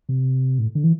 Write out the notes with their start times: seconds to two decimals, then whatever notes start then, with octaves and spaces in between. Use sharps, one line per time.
0.09 C3
0.59 A2
0.75 D3
0.84 E3